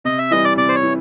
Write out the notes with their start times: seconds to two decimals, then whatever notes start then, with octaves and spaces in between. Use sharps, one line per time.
0.05 C3 D#5
0.18 E5
0.31 E3 G3 D#5
0.45 D5
0.57 C3 D5
0.69 C5
0.75 C#5
0.83 E3